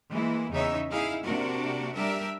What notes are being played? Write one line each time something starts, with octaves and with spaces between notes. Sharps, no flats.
E3 G#3 A#3 E4
E2 C#3 D#4 C#5 E5
D#4 E4 G#4 F5
C3 A#3 D4 F#4 A#4
G3 D4 G4 A#4 E5